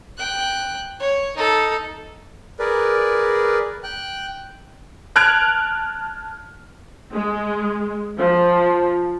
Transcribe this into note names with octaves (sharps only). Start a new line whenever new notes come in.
G5 F#6
C#5
D#4 A4
G#4 A#4 B4 D5
G5 F#6
A5 F6 F#6 G#6 D7 F7
G#3
F3